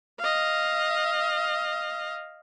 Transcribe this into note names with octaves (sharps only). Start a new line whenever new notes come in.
D#5 F5